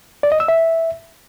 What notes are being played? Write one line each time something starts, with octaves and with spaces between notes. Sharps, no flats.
D5
D#5
E6
E5